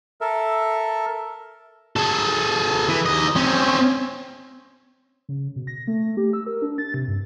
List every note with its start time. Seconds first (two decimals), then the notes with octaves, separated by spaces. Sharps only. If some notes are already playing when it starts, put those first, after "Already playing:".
0.21 A4 A#4 E5
1.96 G#4 A4
2.89 E3
3.06 D#2 D#5
3.36 C4 C#4
5.29 C#3
5.56 B2
5.67 A#6
5.87 A3
6.17 G4
6.33 E6
6.47 A#4
6.62 D4
6.78 A6
6.94 C3
7.08 G2